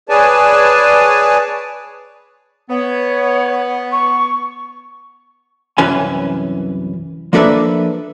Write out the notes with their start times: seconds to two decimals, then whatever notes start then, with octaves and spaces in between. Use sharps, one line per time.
0.09 G#4 B4 C#5 D5 G#5 A5
2.70 B3 C#5
3.92 C#6
5.78 C2 F#2 E3 C#4 B4 G#5
7.33 F3 A#3 D4 A4 B4 E5